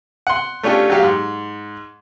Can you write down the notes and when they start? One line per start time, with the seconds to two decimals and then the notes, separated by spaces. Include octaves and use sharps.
0.27 F#5 C6
0.63 A3 C#4 D4 F4 G4
0.90 F#3 G4 F5
1.03 G#2